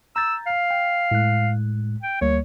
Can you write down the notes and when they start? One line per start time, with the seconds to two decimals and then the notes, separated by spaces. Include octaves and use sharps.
0.16 A#5 E6 G6 A6
0.47 F5
0.71 G5
1.11 A2 G#3 F#6
2.03 G5
2.21 D2 G3 A#3 C#5